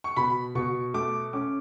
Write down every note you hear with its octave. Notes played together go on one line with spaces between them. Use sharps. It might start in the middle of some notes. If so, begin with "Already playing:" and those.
C#6
B2 B5
B2 C#6
A3 D6
C#4 D6